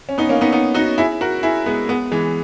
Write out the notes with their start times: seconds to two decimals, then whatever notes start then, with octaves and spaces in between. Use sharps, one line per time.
0.09 C#4
0.18 B3 D#4
0.29 A#3 C#4
0.41 B3 D#4
0.52 B3 D#4
0.75 D#4 F#4
0.98 E4 G#4
1.21 F#4 A#4
1.43 E4 G#4
1.66 G#3 B3
1.89 G#3 B3
2.12 E3 G#3